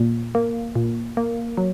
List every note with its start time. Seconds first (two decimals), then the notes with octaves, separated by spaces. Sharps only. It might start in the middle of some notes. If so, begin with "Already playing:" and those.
Already playing: A#2
0.35 A#3
0.76 A#2
1.17 A#3
1.57 F#3